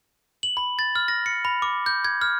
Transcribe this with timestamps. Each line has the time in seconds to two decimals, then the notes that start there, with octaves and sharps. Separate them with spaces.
0.43 F#7
0.57 B5
0.79 A6
0.96 F6
1.08 A#6
1.26 C#7
1.45 B5
1.62 D6
1.86 G6
2.05 G#6
2.21 F6